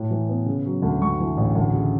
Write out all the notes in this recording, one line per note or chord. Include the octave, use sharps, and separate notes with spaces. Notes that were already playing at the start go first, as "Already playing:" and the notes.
Already playing: A2
E3
B3
C#3
F#3
D2
G2 C#6
E3
A1
D2
C#3